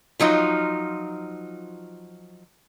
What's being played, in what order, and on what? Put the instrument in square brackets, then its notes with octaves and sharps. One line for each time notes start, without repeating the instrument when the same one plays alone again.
[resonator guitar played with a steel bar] F3 F#3 D#4 F4